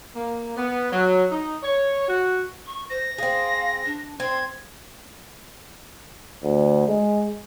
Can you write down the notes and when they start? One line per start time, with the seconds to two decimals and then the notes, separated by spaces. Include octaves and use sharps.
0.15 A#3
0.57 B3
0.92 F#3
1.31 D#4
1.63 C#5
2.08 F#4
2.66 C#6
2.90 C5 A#6
3.18 C4 G#4 F5
3.86 D4
4.20 C4 C6 G#6
6.43 D2
6.89 G#3